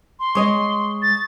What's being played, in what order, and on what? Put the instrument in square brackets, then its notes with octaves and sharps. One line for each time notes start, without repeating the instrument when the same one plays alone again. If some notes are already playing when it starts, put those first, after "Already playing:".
[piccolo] C6
[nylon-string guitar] G#3 C#5 D#5 [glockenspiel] C#6 D#6
[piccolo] A6